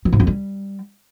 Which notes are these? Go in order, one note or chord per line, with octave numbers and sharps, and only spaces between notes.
E3
G#2
F2
G3